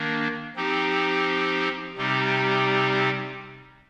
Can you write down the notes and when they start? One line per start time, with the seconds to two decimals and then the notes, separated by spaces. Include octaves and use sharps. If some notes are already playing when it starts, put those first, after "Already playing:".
Already playing: D#3 A#3 D4
0.56 F3 C4 D#4 G4
1.97 C3 G3 C4 D#4 G4